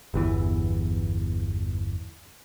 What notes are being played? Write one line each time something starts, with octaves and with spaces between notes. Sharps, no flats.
G1 E2 E3